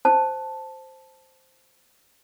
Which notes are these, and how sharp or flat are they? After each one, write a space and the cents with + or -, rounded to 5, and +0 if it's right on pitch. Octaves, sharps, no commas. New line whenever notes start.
C5 +0 A5 +0